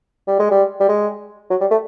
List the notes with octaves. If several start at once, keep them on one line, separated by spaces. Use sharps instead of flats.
G3
G#3
G3
G3
G#3
F#3
G3
A3